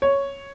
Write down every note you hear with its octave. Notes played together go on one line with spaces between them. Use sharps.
C#5